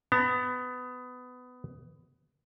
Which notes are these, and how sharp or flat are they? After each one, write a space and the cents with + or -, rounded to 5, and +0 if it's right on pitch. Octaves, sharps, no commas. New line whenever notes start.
B3 +20 A5 +45